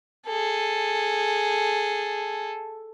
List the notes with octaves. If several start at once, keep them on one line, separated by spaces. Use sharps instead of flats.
G#4 A4